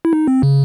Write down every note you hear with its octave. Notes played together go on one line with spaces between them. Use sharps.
E4
D#4
C4
C#3